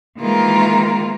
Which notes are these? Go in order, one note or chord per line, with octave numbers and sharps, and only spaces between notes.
D#3 E3 G#3 A#3 F4 A#4